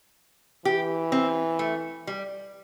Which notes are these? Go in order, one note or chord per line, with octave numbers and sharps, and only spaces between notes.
E3 G4
C4
A3
G3